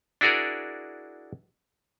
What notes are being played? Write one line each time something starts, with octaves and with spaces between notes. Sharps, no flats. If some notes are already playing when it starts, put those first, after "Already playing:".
D4 E4 F#4 G#4 A#4 D5